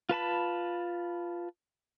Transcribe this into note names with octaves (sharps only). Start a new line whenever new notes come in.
F4 B4 A5 B5